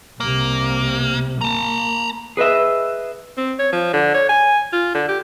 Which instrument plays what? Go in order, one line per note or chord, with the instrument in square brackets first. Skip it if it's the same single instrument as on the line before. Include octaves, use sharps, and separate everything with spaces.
[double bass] C2 C3 [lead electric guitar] A#3
[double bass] A#3 [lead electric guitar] A5 A#5
[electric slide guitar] G#4 B4 D#5 E5
[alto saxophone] C4
C#5
F3
D3
C#5
G#5
F4
D3
G4